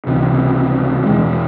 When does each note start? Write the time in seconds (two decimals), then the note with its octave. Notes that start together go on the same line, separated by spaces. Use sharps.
0.06 C#2 C3 E3
1.03 E1 E2 E3 G#3